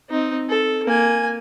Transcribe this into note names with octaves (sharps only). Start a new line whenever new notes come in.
C4 D#4
A4
A#3 G#5